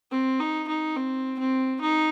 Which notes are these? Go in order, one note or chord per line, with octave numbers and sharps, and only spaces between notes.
C4
D#4
D#4
C4
C4
D#4